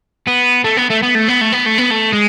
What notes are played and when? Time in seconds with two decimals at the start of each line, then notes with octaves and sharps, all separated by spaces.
0.27 B3
0.64 A3
0.77 B3
0.90 A3
1.02 B3
1.15 A3
1.28 B3
1.41 A3
1.53 B3
1.66 A3
1.79 B3
1.91 A3
2.13 G#3